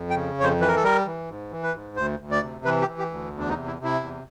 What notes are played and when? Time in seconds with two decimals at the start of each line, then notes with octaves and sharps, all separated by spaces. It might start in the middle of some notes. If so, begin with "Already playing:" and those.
Already playing: F2
0.10 G5
0.15 C#3
0.38 F2 C#5
0.44 C5
0.60 E3 B4
0.68 A#4
0.76 A4
0.83 G3 A#4
1.06 E3
1.29 G#2
1.51 E3
1.63 B4
1.74 G#2
1.96 D2 C5
2.20 D2
2.31 D5
2.42 C3
2.65 E3 B4
2.81 G4
2.88 E3
2.99 G4
3.11 D2
3.33 E2
3.39 D4
3.50 D#4
3.56 C3
3.67 E4
3.78 C3
3.84 E4
4.00 E2